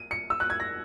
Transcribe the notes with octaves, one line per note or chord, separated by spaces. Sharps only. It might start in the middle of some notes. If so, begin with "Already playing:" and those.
Already playing: D#7
C#7
E6
F#6
G#6
A#6